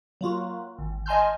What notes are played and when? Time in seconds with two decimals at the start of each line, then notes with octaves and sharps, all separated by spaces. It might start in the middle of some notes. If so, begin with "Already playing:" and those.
0.21 F#3 A#3 F4 F#4
0.78 G#1
1.06 D#5 G#5 A5 C6 F6 G6